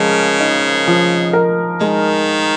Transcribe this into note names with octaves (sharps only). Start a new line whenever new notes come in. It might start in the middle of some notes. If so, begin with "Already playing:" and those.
Already playing: C#3 F3 G#3 A#4
D#4
F3
A#4
D#3 G#3